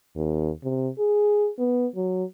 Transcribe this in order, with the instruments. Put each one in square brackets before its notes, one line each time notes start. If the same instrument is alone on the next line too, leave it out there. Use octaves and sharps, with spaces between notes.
[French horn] D#2
C3
G#4
B3
F#3